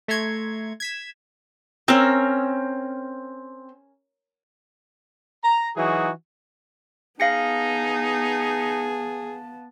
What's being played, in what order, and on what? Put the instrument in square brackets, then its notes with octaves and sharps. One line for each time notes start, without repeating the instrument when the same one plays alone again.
[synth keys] A3 E5 A#5 C6 C#6 G#6
G#6 B6 E7
[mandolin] C4 E6 [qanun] C#4 A#4
[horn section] A#5
E3 F#3 D#4 F#4 G#4
[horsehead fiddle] B3 A5 [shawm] D#4 [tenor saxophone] G#4 [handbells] F5 A#6 C#7